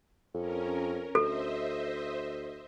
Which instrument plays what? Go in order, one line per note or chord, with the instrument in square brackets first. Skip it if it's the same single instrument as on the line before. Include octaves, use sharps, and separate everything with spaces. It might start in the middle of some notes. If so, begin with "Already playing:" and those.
[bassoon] F2 [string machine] C#4 A#4
[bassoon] D2 [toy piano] A4 [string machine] C5 D#5 E5